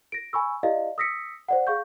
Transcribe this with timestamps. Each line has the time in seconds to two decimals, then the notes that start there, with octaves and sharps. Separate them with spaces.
0.12 A#6 D7
0.33 G#5 B5 C#6 E6
0.63 E4 G4 D5 D#5 F5
0.98 D#6 E6 A#6 B6 C#7
1.48 C5 D5 F#5
1.67 G#4 F5 C#6 G6